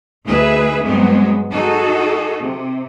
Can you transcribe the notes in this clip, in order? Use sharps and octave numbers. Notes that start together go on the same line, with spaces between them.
D2 D#4 G#4 B4 E5
G2 F#3 G#3 B3 C4
D#4 F#4 G#4 A4
C3